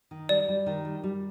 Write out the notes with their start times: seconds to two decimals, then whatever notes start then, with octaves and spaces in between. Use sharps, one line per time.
0.11 D#3
0.29 G3 D5
0.48 G3
0.66 D#3
0.85 G3
1.04 G3